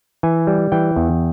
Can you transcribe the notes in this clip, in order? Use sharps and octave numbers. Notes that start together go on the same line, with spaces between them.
E3 G#5
G3
E3 G5
E2